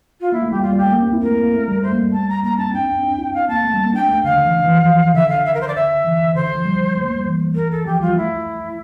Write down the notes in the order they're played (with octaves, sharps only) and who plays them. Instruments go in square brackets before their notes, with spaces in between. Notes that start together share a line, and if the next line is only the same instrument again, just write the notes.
[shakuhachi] F4
[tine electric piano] A#3 [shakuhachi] E4
[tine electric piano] A3
[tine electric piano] G3 [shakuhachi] G4
[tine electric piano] G3 [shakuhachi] F4
[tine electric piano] G3 [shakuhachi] G4
[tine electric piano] A3
A#3
C4
E4
[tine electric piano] A3 [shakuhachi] A#4
[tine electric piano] A#3
A3
G3
[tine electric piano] A3 [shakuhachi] C5
[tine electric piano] A#3
G3
[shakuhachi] A5
A#5
[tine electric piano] A#3 [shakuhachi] A#5
[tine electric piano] C4 [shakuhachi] A5
[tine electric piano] D4 [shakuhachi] G5
[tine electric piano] C4
D4
E4
[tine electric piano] C4 [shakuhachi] F5
[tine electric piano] A#3 [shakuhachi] A5
[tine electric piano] A3
G3
A#3
[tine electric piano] D4 [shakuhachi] G5
[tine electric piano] A3
[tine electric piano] D3 [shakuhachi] F5
[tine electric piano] D3
E3
E3
F3
[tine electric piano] D3 [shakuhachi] E5
[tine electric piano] D3 [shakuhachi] F5
[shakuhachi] E5
A#4
C5
D5
E5
[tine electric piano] E3
[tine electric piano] D3 [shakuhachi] C5
[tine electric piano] D3
F3
G3
A3
A#3
G3
E3
[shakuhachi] A#4
A4
[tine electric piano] F3 [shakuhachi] G4
[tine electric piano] G3 [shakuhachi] F4
[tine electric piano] A3 [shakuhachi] E4